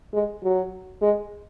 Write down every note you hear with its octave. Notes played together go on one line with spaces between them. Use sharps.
G#3
F#3
G#3